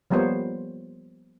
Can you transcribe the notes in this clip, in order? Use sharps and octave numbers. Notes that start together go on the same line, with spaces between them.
F3 G3 A#3 B3 C5 C#5